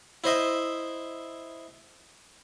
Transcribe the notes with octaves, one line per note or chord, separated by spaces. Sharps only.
E4 C5 D#5 E5